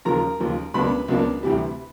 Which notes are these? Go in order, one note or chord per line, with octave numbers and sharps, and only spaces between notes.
D#2 C#3 F3 A#4 A#5
D#2 C#3 F3
C#2 B2 F#3 A#3 D4 B4 B5
C#2 B2 F#3 A#3 D4
D2 C3 E3 G3